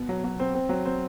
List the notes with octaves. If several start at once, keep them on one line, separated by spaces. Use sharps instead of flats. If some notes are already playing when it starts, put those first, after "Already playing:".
Already playing: B2
F#3
F#3
C4
C4
F#3
C4